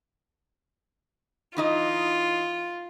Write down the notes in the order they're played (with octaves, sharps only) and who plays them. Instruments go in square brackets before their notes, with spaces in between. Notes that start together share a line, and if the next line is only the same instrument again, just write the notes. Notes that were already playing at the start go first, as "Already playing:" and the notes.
[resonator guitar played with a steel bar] E3 D#4 D#5 [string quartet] F4